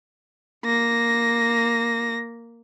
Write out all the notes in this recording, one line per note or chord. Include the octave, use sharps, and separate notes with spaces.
A#3 A#6